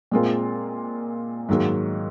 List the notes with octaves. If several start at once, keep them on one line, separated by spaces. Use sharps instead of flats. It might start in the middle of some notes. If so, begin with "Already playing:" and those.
A#2 G#3 C4 F4 A#4
G#2 D#3 F#3 A#3